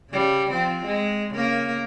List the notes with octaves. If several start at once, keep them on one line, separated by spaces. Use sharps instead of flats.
C#3 G3
F3 C4
G#3
C#3 A#3 A#4